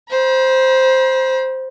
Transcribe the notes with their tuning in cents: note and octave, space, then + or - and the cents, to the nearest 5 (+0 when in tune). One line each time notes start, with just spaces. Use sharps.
C5 +0 B5 -45